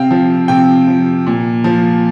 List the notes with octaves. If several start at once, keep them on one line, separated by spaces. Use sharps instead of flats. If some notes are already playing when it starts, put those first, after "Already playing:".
Already playing: C3 F5 G5
F3
C3 G5
F3
A#2
F3